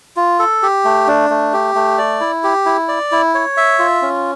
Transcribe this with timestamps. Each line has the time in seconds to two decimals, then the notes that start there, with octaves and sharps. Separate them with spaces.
0.16 F4
0.39 A4
0.63 G4
0.85 A3
1.08 D4
1.30 A3
1.53 G4
1.75 A3
1.98 D5
2.20 E4
2.44 G4
2.66 E4
2.88 D5
3.12 E4
3.35 C#5
3.57 E5
3.79 F4
4.02 C#4